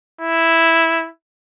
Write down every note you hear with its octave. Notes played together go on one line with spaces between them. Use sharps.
E4